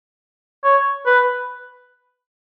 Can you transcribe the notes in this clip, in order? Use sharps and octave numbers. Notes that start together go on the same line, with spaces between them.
C#5
B4